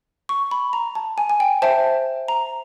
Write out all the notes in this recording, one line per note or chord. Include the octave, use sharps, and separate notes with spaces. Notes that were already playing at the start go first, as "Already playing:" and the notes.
C#6
B5
A#5
A5
G#5
G#5
G5
C5 E5 G5 A5
A#5